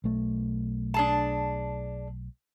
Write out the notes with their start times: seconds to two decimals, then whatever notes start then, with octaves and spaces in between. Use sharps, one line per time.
0.04 B1 A3
0.94 D4 G#4 A5